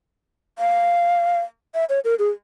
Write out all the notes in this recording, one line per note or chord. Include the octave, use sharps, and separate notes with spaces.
F5
E5
C#5
A#4
G#4